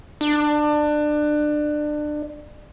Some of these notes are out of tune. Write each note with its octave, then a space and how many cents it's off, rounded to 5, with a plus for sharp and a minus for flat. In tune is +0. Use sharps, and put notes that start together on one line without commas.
D4 +25